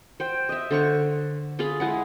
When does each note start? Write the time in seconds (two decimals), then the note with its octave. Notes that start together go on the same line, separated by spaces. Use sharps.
0.20 C5 G5
0.49 D#5 E5
0.71 D3 C5 C#6
1.59 F4 G#4 F5 B5
1.80 G#3 E4 F#5